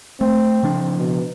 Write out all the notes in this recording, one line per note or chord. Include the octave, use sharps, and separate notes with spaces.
A3 C4
C#3 F3 D4
B2